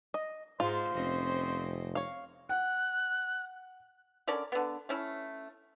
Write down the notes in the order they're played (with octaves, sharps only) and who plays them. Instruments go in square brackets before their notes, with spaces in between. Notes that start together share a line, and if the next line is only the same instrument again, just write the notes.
[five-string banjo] D#5
[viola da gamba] G#2 G#3 [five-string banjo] F4 [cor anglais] C5
[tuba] F1 [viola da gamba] C4 C#4 D#5
[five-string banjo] C#5 F5
[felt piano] F#5 [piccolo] F#6
[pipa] D3 C#4 A#4 D5
D3 B3
A3 C#4 E4